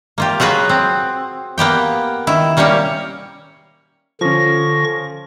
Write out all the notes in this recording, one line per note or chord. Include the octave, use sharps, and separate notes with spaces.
A#3 F4 G4
F#3 F4 F#4 G#4 B4
C4
A#3 B3 G4 G5
D#3 E4
G3 A#3 C#4 G4 C#5
D3 F3 C#4 C#6 A#6